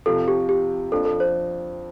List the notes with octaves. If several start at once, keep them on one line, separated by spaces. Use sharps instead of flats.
F2 C3 F3 A4
G4
G4
F2 F3 D4 A4
A4
C5